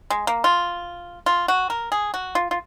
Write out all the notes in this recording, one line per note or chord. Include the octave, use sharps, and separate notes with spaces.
G#3
A#3
F4
F4
F#4
A#4
G#4
F#4
F4
F4